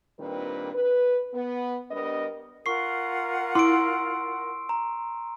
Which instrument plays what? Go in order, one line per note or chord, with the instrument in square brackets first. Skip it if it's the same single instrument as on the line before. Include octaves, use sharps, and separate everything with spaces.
[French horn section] A#2 D#3 G3 C4 D4 B4
B4
B3
G3 B3 D4 A#4 D#5
[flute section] F4 A#4 F#5 [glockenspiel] C#6 C7
[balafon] E4 [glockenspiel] C6 E6 D7
[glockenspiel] A#5